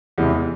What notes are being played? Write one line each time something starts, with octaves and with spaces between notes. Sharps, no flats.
E2 C3 E3 G#3